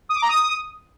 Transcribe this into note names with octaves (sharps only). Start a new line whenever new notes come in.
D#6
D6
A#5
D#6